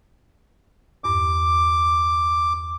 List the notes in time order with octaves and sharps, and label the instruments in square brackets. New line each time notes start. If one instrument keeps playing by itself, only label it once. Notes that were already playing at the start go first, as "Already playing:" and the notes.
[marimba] E2 G2 [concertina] D6